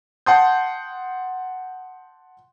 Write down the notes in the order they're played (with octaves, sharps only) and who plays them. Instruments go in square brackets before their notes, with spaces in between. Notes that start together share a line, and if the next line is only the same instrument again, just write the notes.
[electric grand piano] F#5 G5 A5 C6 D#6 G6